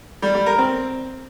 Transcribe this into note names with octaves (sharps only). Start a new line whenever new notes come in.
G3
G3
A#4
C4